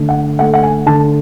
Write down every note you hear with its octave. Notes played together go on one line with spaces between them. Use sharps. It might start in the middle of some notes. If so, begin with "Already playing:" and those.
Already playing: D3 A3
F#5
A3 F#5
F#5
G#5
D3 A5